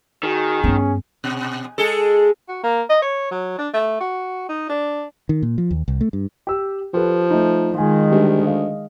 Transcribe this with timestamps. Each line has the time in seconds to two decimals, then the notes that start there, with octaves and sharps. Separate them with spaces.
0.23 D#3 F#4 G#4
0.64 G2 B3 C#4
1.24 B2
1.78 G#3 G#4 A4
2.49 F#4
2.64 A#3
2.90 D#5
3.02 C#5
3.31 F#3
3.58 D4
3.74 A3
4.00 F#4
4.49 D#4
4.69 D4
5.29 D#3
5.43 A#2
5.58 F3
5.71 D#2
5.88 C2
6.01 A3
6.13 G2
6.47 G4 E6
6.94 F3 G4 A4 B4
7.31 A3 D#4
7.75 D#3 G#3 F4 G#5
8.11 D2 G3
8.46 D#5 F5